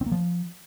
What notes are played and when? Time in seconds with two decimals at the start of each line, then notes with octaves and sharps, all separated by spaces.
0.01 C4
0.06 A#3
0.11 F3